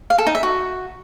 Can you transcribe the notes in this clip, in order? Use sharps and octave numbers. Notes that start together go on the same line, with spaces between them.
F5
A4
D#4
E5
F#4